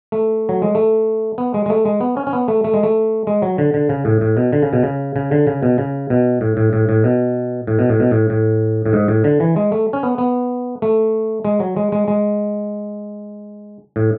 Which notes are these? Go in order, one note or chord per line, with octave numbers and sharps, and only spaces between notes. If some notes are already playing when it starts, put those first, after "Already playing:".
A3
F#3
G#3
A3
B3
G#3
G#3
A3
G#3
B3
C#4
C#4
B3
A3
A3
G#3
A3
G#3
F#3
D3
D3
C#3
A2
A2
B2
D3
C#3
B2
C#3
C#3
D3
C#3
B2
C#3
B2
A2
A2
A2
A2
B2
A2
B2
A2
B2
A2
A2
A2
G#2
A2
D3
E3
G#3
A3
C#4
B3
B3
A3
G#3
F#3
G#3
G#3
G#3
A2